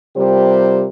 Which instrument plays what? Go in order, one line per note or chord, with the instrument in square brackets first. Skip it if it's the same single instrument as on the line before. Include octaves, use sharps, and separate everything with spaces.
[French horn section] C3 G3 F4 G4 A#4 C5